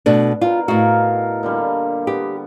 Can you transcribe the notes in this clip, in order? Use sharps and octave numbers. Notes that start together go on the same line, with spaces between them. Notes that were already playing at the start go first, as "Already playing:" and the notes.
B2 A3 D4
B2 F4 A#4
A2 D#4 F#4 F5
A#2 D3 G3
B3 G4